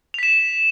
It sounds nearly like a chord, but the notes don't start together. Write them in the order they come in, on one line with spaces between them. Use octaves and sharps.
F7 B6 E7